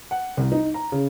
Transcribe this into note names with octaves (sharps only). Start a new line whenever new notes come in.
F#5
C2
D#4
A#5
C#3